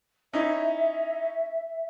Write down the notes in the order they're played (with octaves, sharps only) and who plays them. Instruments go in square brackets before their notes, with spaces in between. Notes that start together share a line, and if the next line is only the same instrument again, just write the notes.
[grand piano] C#4 D#4 E4 [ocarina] E5